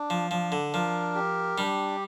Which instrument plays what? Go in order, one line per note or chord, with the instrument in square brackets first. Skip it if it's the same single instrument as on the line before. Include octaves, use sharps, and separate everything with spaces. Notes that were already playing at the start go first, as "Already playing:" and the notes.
Already playing: [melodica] D4
[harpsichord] F3
[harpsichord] F3 [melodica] D4
[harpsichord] D3
[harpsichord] F3 [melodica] A#4
[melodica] G4
[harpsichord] G3 [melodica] D4